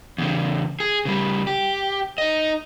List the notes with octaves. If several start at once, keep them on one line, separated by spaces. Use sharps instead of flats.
E2 C#3
G#4
C#3 G3
G4
D#4 D#5